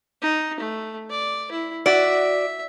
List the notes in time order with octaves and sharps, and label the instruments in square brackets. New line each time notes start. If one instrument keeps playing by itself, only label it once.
[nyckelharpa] D#4
A3
D5
E4
[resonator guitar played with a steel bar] F#4 D5 [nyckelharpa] E5